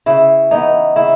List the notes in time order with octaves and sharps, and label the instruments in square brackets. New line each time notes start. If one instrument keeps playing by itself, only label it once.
[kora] C#3 E4
E3 B3 D#4
C#3 E4